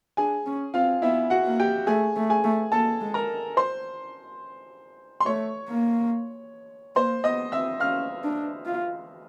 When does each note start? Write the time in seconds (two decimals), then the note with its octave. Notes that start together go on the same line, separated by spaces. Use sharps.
0.17 D4 G#4 G#5
0.47 C#4
0.74 C4 F4 F5
1.02 B3 E4 E5
1.30 F#4 F#5
1.46 A#3
1.60 G4 G5
1.87 A3 G#4 G#5
2.16 A3
2.30 G#4 G#5
2.44 A3
2.72 A#3 A4 A5
3.01 G#3
3.14 A#4 A#5
3.57 C5 C6
5.20 C6
5.26 A3 C#5 C#6
5.69 A#3
6.95 A#3 C5 C6
7.24 B3 D#5 D#6
7.52 C4 E5 E6
7.80 C#4 F5 F6
8.24 D4
8.66 F4